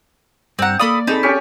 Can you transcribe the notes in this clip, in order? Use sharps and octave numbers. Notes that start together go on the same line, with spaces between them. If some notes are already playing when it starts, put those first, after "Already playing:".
G2 C4 F#5 A#5
A#3 A4 D5 F5 B5 D#6
C4 D#4 G#4 A4 A5 B5
C#4 G4